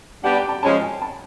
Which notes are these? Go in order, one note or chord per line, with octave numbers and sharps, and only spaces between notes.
G3 B3 D4 G4 F#5
G5
A5
F3 G#3 C#4 A5
G#5
A5